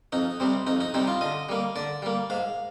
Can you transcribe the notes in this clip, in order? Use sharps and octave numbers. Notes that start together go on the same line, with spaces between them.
F2 D#4
C3 G3 C4
F2 D#4
D#4
C3 G3 C4 D#4
F4
D3 D#5
G3 A#3
D3 D5
G3 A#3
G#2 F5